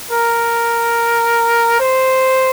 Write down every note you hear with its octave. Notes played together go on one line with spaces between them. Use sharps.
A#4
C5